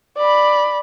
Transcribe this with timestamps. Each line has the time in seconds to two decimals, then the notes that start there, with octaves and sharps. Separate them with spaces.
0.17 D5 B5